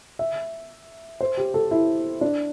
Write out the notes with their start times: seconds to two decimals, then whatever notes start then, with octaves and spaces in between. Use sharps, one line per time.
0.19 E5
1.21 C5
1.37 G4
1.54 A4
1.71 E4
2.21 D4